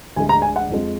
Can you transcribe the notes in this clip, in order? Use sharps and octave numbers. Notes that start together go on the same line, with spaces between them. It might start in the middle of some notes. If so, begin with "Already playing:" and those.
D2 D3 G#3 G#5
A#5
G#5
F#5
F2 F3 G#3